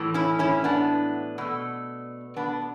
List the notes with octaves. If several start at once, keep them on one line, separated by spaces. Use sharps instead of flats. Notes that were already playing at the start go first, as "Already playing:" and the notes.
Already playing: A2 E3
C#4 E4
C#4 E4
B3 D4
B2 A3
B3 D4